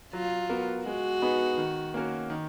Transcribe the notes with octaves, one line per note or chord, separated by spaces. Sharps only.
F#3 F4
B3 F#4 A#4
G#3 F#4
B3 D#4 G#4 B4
D#3
A#3 C#4 F#4 A#4
D#3